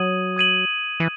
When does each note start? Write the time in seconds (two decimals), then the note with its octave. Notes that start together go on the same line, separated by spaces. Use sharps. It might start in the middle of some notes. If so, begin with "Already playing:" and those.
Already playing: F#3 D#6 G#6 D#7 F#7
0.37 D#6 G#6 D#7 F#7
1.00 E3